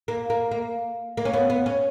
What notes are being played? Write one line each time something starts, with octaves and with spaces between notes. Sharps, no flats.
A#3
A#3
A#3
A#3
C#4
B3
B3
C#4